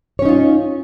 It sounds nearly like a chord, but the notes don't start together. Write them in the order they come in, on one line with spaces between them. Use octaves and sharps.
C#5 C#4 D#4 F4